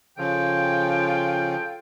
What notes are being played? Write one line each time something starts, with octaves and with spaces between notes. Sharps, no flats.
C#3 F3 F4 A4 G5